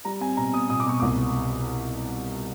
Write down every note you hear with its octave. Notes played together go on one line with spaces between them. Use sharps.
G3 A#5
C4 G#5
B2 A#5
B2 D#6
B2 D#6
D6
B2 C#6
C2 D6